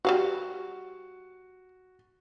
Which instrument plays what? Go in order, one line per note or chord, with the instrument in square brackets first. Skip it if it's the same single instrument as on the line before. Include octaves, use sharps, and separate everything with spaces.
[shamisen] G3 F5 F#5 [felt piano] F#4